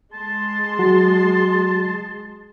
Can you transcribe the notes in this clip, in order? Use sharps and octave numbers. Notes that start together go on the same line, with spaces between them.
G#3 A5 C6
F#3 F#4